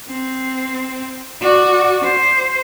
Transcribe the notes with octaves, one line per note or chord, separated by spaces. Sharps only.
C4
F#4 D5
C5